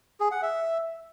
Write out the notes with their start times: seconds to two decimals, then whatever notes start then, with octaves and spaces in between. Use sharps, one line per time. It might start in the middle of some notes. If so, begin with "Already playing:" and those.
0.20 G#4
0.31 F#5
0.42 E5